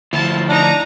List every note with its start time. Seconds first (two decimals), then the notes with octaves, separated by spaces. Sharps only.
0.13 D2 F3 E4 A5
0.49 D4 D#4 A#5